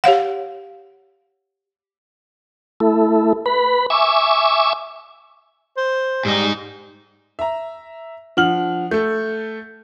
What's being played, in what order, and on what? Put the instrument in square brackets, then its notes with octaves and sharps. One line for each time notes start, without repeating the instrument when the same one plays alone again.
[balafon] G4 C#5 F5 F#5
[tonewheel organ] A3 E4 A4
B4 B5
E5 G#5 C#6 D6 E6
[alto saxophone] C5
[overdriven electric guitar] G#2 D#4 [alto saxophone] G3
[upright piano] E5 A#5
[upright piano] F3 F6 F#7 [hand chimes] D4 F#5
[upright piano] A3 A4 [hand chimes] G6